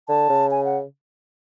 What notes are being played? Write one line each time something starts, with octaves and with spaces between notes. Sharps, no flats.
D3 A5
C#3
G#5
F#5